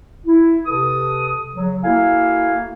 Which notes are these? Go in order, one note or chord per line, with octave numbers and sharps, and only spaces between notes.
E4
C3 A4 B4 D#6
C#3 F#3
A#3 E4 F#4 A4 F5 G#5